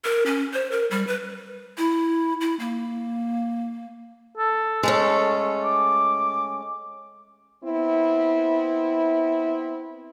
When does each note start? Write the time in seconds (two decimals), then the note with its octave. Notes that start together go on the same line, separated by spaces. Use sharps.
0.05 A#4
0.26 C#4
0.53 C5
0.71 A#4
0.91 G3
1.07 B4
1.78 E4
2.41 E4
2.60 A#3
4.37 A4
4.83 G#3 A3 C#4 A4
5.64 D6
7.64 B3 C4 E4